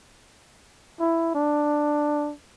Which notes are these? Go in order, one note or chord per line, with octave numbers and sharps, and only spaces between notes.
E4
D4